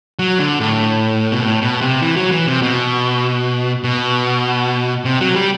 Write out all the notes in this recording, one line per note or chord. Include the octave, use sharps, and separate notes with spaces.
F#3
D3
A2
B2
A2
B2
C3
E3
F#3
E3
C3
B2
B2
C3
F#3
G3